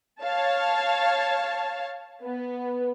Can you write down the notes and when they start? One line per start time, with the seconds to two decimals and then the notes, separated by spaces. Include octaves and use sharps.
0.23 C#5 F5 A5
2.24 B3